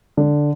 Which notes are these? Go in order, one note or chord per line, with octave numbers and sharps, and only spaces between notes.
D3